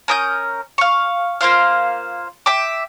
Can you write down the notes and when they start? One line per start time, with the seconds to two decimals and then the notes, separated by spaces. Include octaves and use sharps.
0.08 C#4 A#4 D#6 G6
0.78 F5 C#6
1.41 A#3 F4 C5 F5
2.46 E5 G5 D6